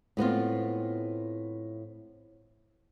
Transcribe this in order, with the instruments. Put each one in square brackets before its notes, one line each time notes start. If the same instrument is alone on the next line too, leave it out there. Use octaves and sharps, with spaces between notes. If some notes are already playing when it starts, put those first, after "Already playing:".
[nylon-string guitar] A2 B3 C4 F4